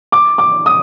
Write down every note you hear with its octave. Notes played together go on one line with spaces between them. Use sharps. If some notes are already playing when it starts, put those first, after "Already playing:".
D6
D6
D#6